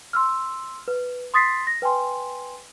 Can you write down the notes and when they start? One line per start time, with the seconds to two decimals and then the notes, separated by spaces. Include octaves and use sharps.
0.13 C6 E6 F6
0.88 B4
1.34 C6 D#6 A6 B6 C7
1.67 A#6
1.82 B4 G5 G#5 C6